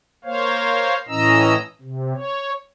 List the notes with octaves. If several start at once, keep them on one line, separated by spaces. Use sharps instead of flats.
A#3 C5 C#5 F5
A2 E3 C#4 D#5 A#5 E6
C3
C#5